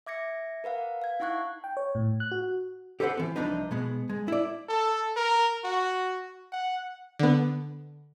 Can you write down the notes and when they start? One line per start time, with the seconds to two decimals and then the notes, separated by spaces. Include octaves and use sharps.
0.06 E5 D6 G#6 A#6 C#7
0.64 A#4 B4 F5 F#5
1.02 F5 G#6
1.20 D#4 E4 F#5 C#6 F#6 G#6
1.64 G5
1.77 C#5
1.95 A2
2.20 F#6
2.31 F#4
3.00 G4 A4 B4 C5 E5 F#5
3.17 E3 C4
3.36 C2 G2 F3 D4 D#4 B4
3.71 B2 G#3 B3
4.09 G#3
4.28 E4 D5
4.69 A4
5.16 A#4
5.64 F#4
6.52 F#5
7.19 D3 B3